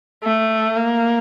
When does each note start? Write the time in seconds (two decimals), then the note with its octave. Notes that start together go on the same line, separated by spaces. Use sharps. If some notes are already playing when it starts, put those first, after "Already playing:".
0.24 A3
0.77 A#3